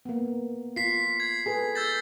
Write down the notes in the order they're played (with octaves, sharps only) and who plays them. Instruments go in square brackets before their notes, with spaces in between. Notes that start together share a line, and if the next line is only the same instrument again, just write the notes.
[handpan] A#3 B3
[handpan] F4 [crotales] B6 C7
[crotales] G#6
[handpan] G#4 A4 B4
[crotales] E6 G6 A6